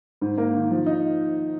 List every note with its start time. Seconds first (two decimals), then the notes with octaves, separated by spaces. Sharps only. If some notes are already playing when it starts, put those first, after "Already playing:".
0.21 G#2
0.38 A#3
0.54 D#3
0.71 F3
0.86 D#4